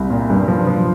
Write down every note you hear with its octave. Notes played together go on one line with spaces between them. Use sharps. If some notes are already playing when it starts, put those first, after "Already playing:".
Already playing: C2
A#2
G2
F3
F3